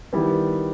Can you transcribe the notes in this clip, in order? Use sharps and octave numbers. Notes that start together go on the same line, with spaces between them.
D#3 G3 B3 E4 G4